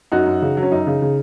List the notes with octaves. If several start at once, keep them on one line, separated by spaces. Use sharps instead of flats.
F#2 D#4 F#4
F#2
C#3
F#3
C#4
F#2 D#4
C#3
C#3